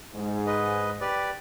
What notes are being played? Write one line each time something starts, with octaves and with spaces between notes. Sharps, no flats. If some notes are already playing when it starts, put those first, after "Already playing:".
G#2
B4 D#5
G4 B4 D5